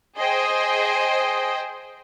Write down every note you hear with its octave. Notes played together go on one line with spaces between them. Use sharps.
G#4 C5 D#5 G5